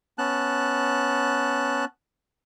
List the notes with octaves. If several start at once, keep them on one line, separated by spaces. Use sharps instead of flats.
B3 C#4 A5 F#6